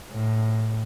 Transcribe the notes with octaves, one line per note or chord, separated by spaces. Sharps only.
A2